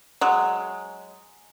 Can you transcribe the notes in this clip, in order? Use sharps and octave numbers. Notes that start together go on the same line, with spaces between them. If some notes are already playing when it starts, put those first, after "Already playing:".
F#3 G#3